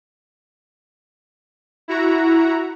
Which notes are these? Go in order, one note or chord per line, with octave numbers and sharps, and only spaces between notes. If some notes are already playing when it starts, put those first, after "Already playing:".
E4 F#4 A#5